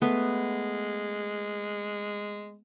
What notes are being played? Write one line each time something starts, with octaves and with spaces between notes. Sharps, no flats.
G#3 A3 B3 B4